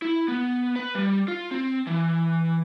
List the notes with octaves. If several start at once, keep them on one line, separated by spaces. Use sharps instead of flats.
E4
B3
B4
G3
F4
C4
E3